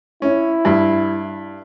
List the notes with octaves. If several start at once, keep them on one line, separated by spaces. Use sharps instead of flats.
C#4 E4
G2